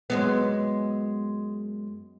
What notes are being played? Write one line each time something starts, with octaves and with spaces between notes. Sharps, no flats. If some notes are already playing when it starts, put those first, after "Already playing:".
F#2 G#3 B3